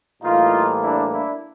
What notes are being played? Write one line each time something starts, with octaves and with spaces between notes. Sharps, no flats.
A2 E3 G3 A#3 D#4 F4
D4 E4
D4 E4